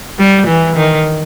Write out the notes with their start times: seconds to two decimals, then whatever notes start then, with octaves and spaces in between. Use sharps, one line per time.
0.19 G3
0.47 E3
0.77 D#3